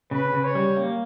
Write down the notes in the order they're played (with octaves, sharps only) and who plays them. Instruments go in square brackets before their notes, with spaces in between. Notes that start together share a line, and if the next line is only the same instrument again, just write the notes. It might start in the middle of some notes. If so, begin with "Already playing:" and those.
[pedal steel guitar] C#3 [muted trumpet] B4
[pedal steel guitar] C#3
[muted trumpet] C#5
[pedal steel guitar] G3
A#3